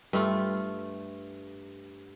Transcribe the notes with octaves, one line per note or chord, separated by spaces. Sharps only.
G2 A3 F4